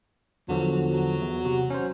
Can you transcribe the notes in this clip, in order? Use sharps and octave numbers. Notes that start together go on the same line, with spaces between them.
E2 D3 F3 F#3
F#3
E2
C3 F#4
C#4 C5